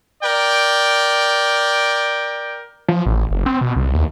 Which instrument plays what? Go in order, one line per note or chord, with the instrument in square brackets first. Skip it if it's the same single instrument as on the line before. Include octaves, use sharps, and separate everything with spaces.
[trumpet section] A#4 D5 G5
[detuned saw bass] F3
A1
F#1
C4
B2
C2
D#2